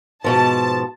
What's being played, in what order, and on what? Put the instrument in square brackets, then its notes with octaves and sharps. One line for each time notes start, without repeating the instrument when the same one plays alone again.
[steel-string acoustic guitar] G#2 B2 F3 [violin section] A5